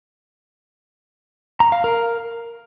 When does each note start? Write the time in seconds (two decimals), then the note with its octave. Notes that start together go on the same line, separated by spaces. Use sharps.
1.60 A#5
1.72 F5
1.84 A#4